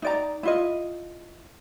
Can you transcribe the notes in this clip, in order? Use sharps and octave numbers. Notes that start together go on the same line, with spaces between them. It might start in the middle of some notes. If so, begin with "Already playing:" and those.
D#4 D5 A#5
E4 F4 D#5